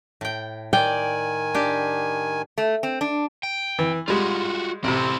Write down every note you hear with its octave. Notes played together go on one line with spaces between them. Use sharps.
A2 G5
D#3 D5 G5 G#5
D4 G4
A3
C4
D4
G5
E3
G3 G#3 F4 F#4
A1 C3 C4 E4